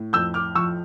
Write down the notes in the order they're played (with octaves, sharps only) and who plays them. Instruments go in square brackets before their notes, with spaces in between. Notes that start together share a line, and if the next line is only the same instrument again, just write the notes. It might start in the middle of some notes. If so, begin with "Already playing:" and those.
Already playing: [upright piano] A2
F2 E6 G6
D6 F6
F3 C#6 E6